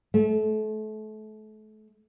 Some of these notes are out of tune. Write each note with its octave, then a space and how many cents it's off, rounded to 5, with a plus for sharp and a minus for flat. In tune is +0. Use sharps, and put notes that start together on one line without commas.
A3 -35